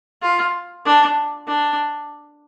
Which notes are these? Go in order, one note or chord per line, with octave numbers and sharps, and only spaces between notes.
F4
D4
D4